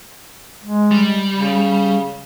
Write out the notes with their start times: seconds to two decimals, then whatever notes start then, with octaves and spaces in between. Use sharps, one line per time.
0.63 G#3
0.91 G3
1.33 C#3